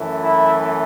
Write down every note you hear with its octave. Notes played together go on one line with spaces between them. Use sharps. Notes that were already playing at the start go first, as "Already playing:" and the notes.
Already playing: F#2 E3 A3
E4